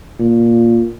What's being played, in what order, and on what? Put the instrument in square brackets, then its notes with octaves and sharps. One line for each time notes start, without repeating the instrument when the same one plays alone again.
[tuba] A#2